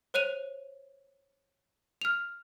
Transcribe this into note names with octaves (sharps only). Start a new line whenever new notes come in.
C5 C#5 F#6 D#7 F7
F6 F7